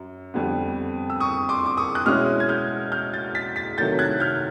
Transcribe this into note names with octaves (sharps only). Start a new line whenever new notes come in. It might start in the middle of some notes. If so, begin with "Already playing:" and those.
Already playing: F#2
F2 D3 G3 B3
E6
C#6 D#6
C6 D6
D6
C#6 D#6
F#6
B2 G#3 C#4 E4 D#6 F6
G#6
F6 G6
F6 G6
G6 A6
A6 B6
A6 B6
C3 D#3 F#3 A3 G6 A6
F#6 G#6
F6 G6